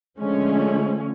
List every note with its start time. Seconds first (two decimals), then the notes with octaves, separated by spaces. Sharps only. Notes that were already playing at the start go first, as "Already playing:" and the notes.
0.19 D3 F3 G#3 A3 C#4